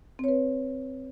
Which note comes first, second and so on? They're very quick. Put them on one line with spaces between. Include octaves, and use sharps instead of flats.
C4 C#5 B4